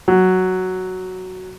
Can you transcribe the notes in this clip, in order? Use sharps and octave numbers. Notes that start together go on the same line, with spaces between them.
F#3